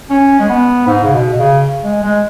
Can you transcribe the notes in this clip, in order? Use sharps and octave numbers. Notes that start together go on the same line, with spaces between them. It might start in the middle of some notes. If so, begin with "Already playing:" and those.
C#4
G#3
B3
G#2
C#3
B2
B2
C#3
G#3
G#3